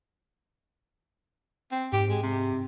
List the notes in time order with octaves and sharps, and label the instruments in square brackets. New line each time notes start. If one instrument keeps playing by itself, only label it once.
[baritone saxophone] C4
[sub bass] G#2 [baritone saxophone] G4
[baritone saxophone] G#3
C3